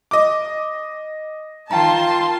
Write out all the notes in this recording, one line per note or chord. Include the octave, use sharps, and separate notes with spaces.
D#5 D6
D#3 F4 G5 A5 A#5 C6